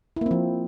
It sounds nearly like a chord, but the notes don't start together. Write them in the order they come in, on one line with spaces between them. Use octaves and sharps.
E4 A#3 C4 F3